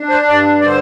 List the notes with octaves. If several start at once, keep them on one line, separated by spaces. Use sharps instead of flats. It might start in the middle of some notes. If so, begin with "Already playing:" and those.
Already playing: D4
C5
G2 D5
D5
D3 C5